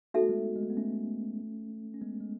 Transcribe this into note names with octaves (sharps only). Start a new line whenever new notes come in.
B3 D#4 F#4 A4 E5
A3
G#3 B3
G#3
A3
B3
A3 C#4
C#4
G#3 B3
G#3